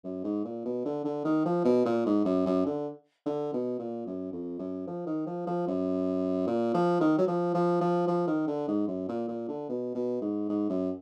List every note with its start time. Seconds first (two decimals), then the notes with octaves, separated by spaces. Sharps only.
0.04 F#2
0.24 G#2
0.45 A#2
0.65 B2
0.85 D3
1.05 D3
1.24 D#3
1.45 F3
1.65 B2
1.85 A#2
2.06 G#2
2.25 F#2
2.46 F#2
2.66 D3
3.26 D3
3.53 B2
3.79 A#2
4.07 F#2
4.32 F2
4.59 F#2
4.87 F3
5.06 D#3
5.27 F3
5.47 F3
5.67 F#2
6.47 A#2
6.74 F3
7.01 D#3
7.18 F#3
7.27 F3
7.54 F3
7.81 F3
8.08 F3
8.27 D#3
8.47 D3
8.68 G#2
8.87 F#2
9.09 A#2
9.28 A#2
9.48 D3
9.69 B2
9.95 B2
10.21 G#2
10.49 G#2
10.69 F#2